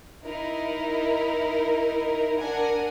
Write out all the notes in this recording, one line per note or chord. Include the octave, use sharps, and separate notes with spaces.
D#4 E4 A#4
D4 A#4 F#5 G#5